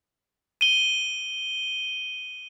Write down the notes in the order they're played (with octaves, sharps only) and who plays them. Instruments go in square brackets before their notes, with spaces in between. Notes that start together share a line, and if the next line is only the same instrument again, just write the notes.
[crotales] D#7 G7